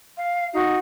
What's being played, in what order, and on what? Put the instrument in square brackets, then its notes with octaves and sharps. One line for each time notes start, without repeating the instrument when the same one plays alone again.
[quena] F5
[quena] D#4 [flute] F#4